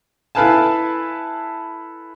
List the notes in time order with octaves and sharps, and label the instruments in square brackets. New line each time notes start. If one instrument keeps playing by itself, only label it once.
[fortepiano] E4 A4 B4 F5 G#5 A5